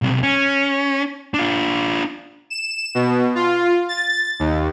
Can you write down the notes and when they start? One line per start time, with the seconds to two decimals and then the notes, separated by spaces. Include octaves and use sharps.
0.02 B1 C3
0.23 C#4
1.34 D4 F4
2.50 E7
2.95 B2
3.35 F4
3.89 A6
4.40 D#2